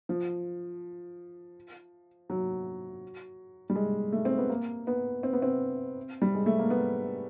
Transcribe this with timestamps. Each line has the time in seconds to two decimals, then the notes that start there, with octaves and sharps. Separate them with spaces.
0.09 F3
2.30 F#3
3.70 G3
3.76 G#3
4.12 A3
4.25 C4
4.38 B3
4.49 A#3
4.87 B3
5.23 C4
5.33 B3
5.42 C4
6.22 G3
6.35 G#3
6.46 A3
6.59 A#3
6.70 B3